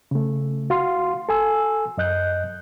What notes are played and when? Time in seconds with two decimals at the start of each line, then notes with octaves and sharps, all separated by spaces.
0.11 C#3 A3
0.70 F#4 F5 C6
1.29 A4 G#5 E6
1.98 F#2 D#5 F#6 G6